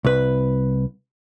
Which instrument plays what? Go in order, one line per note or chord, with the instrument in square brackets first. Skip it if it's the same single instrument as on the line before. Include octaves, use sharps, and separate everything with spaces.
[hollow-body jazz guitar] C2 B4